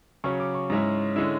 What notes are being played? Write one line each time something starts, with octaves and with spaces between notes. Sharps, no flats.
C#3 F#3 C#4 C#6
D6
C#6
G#2 G#3 C#4 E4
D3 G#3 C#4 E4